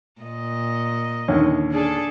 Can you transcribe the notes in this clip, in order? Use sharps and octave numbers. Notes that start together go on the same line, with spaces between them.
A#2 D#5
D#2 D3 C#4
D4 G#4 A4